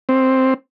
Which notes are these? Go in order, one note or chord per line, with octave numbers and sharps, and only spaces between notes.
C4